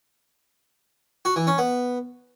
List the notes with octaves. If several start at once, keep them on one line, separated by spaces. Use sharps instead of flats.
F#4
E3
C#4
B3